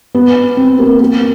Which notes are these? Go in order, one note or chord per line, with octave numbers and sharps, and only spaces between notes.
B3
C4
A#3
A#3